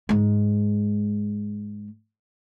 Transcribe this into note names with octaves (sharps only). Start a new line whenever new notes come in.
G#2 G#3